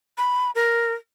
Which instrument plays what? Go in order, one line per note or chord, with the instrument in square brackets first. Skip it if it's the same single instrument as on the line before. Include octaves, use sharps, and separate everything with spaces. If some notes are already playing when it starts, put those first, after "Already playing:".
[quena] B5
A#4